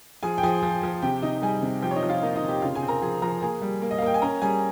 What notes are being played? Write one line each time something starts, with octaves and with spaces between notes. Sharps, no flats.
F3 G#4 G#5
G5
F3 G#4 G#5
F3
F3
C3 G4 G5
C3 D#4 D#5
G3 G#4 G#5
C3
F3 G4 G5
C#5
D#4 D#5
F3
F4 F5
A#3 D#4 D#5
D#4 D#5
C3
G4 G5
C#3 F4 F5
G#4 G#5
C4
A#4 A#5
F3 G#4 G#5
F3 A#4 A#5
A#3 G#4 G#5
G3
A#3
D#5
F5
A#3 G5
G#5
C#4 A#4 A#5
G3 G#4 G#5